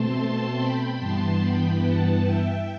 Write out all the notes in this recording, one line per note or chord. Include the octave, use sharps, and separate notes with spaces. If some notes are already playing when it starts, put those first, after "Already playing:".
Already playing: B2 A3 C4 A5 C6
G5 B5
G2 E3 B3 A5 C6
G5 B5
F#5 A5
E5 G5